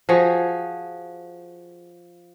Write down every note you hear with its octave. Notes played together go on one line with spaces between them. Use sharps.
F3 F#4 G#4 C#5